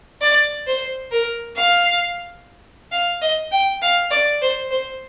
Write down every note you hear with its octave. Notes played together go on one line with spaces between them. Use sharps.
D5
C5
A#4
F5
F5
D#5
G5
F5
D5
C5
C5